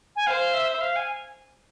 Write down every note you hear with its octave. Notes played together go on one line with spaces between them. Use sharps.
G#5
C5 F5
E5
E5
F5
G#5